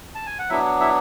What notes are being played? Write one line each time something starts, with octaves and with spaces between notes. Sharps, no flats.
A5
G#5
F#5
F#3 B3 D4 E4 E5
E4 E5